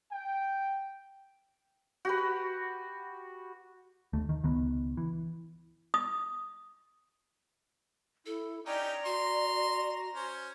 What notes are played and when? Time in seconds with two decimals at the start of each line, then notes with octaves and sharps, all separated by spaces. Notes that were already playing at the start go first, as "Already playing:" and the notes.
0.11 G5
2.05 F#4 G4 B4
4.13 D#2 A3
4.29 D#3
4.43 C#2 D#3 B3
4.97 E3
5.94 D#6
8.26 E4 A4
8.66 C#4 D#4 G4 D5 G5 A#5
9.05 F#4 C6
10.15 C#4 C5